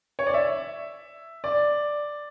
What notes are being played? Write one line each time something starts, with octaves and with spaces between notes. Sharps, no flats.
C#5
D5
E5
D5